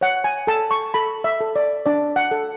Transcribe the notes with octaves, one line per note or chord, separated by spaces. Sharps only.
C#5 F#5
G#5
A4 A5
C#6
A4 B5
E5
A4
D5
D4 D5
F#5
A4